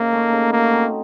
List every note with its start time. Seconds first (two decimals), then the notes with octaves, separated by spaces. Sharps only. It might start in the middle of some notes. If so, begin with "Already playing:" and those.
Already playing: C#3 A#3 D#4
0.12 A3
0.32 C#3
0.53 A#3 F#4
0.72 C4